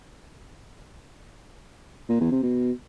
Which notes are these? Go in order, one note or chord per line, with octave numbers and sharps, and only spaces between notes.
A#2
E2
C3
B2